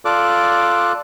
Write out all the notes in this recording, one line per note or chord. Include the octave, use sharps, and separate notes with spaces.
F4 A4 D5 D6 F#6